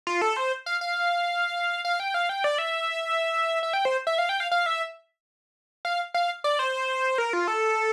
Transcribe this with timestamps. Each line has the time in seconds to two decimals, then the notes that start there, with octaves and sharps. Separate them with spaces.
0.07 F4
0.22 A4
0.37 C5
0.66 F5
0.81 F5
1.85 F5
2.00 G5
2.14 F5
2.29 G5
2.44 D5
2.58 E5
3.63 E5
3.73 G5
3.85 C5
4.07 E5
4.18 F5
4.29 G5
4.40 F5
4.52 F5
4.66 E5
5.85 F5
6.14 F5
6.44 D5
6.59 C5
7.18 A#4
7.33 F4
7.48 A4